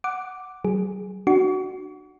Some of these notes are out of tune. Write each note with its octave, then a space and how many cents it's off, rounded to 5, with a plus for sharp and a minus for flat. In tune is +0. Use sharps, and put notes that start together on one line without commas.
F#5 +0 D6 +0
F#3 +40 G#4 +0
D4 +45 F#4 +10 C#6 +40